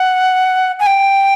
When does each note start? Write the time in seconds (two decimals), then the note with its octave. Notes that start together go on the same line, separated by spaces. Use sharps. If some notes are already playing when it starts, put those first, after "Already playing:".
Already playing: F#5
0.80 G#5
0.86 G5